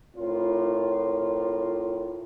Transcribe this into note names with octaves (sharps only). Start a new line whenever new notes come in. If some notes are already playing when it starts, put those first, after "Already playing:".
A2 C4 F4 A#4 C#5